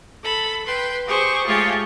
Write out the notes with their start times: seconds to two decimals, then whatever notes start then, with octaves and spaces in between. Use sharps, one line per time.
0.24 A4 B5
0.67 B4 G5 C6
1.07 G4 G#4 C5 C#6
1.45 G#3 A3 F4 G4 G#4 C#5